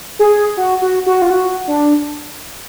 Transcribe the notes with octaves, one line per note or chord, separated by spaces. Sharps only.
G#4
F#4
F#4
F#4
F4
F#4
D4